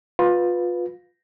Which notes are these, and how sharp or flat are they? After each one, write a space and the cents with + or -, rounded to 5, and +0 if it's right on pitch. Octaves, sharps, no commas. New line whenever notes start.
F4 +25 B4 +0